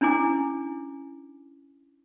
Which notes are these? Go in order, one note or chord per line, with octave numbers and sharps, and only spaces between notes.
C#4 D4 E4 G#5 D6